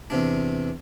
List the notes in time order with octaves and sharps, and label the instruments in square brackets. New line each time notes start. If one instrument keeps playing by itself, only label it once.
[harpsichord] E2 C3 D4